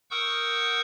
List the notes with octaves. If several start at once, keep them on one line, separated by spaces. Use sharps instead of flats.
A#4 F#5 C#6 D#6 E6 G6